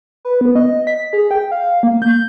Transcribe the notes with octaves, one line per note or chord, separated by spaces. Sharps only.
B4
B3
D#5
B6
G#4
G5
F5
A#3
G6